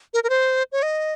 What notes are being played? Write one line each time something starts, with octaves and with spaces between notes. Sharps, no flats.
A#4
A#4
C5
C#5
D#5